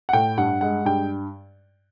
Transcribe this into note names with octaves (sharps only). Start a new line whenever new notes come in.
F#5
A2 G5
G2 F#5
G#3 F#5
G2 G5